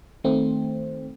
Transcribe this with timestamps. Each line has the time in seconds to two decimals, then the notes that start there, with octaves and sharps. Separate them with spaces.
0.24 D#3 A3 C4